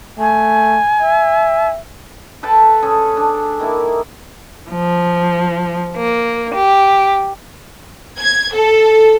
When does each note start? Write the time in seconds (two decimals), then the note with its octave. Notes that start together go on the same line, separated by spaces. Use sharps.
0.19 A3 G#5
1.02 E5
2.43 A4 B4 G5 A5
2.82 C#4 G#4 A4
3.17 D4
3.59 D#3 A#3 E4 G#4
4.70 F3
5.97 A#3
6.55 G4
8.19 G#6
8.54 A4